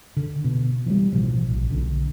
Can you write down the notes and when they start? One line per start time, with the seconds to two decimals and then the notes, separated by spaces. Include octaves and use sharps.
0.17 D3
0.44 B2
0.86 E3 F#3 G3
1.13 A1 B2 F3
1.49 A#1
1.70 B1 D3